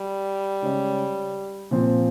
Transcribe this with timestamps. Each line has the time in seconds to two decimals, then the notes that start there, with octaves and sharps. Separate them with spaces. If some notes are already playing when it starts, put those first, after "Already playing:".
Already playing: G3
0.63 C#3 G#3 C#4 G#4 D#5
1.71 A#2 F3 C4